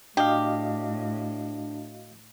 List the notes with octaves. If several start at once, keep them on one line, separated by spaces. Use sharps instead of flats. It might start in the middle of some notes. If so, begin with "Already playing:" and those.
A2 D4 F#4 G4 D#5 F5